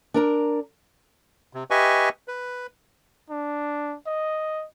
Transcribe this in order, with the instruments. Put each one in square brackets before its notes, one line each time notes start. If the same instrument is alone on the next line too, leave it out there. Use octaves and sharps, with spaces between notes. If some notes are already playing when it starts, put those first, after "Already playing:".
[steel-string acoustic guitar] D4 A#4 A#5
[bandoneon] C3
G4 B4 D#5 E5 G#5 C#6
B4
[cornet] D4
D#5